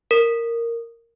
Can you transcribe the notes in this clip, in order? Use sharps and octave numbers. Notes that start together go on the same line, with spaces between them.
A#4